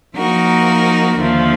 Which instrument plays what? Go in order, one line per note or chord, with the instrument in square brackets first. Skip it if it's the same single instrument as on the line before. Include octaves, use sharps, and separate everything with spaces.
[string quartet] F3 A#3 D#4 F#4 A#4
D#2 D3 F3 A3